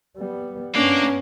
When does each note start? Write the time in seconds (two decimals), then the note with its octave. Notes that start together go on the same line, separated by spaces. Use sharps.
0.18 G3 B3
0.75 G2 A#3 B3 C#4 D4